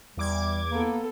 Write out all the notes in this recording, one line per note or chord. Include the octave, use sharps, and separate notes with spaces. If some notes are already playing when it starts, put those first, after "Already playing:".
E2 G3 D6 G#6
A#3 B3 A4